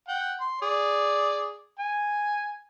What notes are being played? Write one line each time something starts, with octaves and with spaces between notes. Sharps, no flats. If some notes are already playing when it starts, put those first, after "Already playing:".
F#5 G5
C6
G#4 D5
G#5